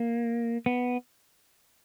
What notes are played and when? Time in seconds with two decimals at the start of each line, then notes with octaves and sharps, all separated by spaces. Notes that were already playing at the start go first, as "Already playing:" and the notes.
Already playing: A#3
0.66 B3